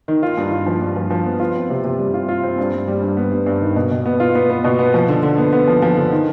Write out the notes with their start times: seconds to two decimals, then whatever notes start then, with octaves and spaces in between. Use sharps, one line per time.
0.08 D#3
0.23 F4
0.37 G2
0.52 F4
0.66 F3
0.81 G2
0.96 F3
1.10 F3
1.26 B3
1.40 F4
1.56 C4
1.70 C3
1.84 C3
1.99 G3
2.14 F4
2.29 F4
2.43 C4
2.58 G2
2.73 G2
2.88 G3
3.02 G2
3.17 B3
3.32 G2
3.46 G2
3.61 D#3
3.76 B2
3.91 B2
4.06 B3
4.20 F4
4.35 B3
4.50 B3
4.64 B2
4.79 B3
4.94 F3
5.09 D3
5.23 D3
5.38 B3
5.53 B3
5.68 F3
5.82 F3
5.97 D3
6.12 D#3